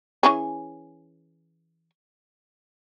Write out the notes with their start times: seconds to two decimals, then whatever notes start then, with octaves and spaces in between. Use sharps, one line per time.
0.23 E3 C#4 G#4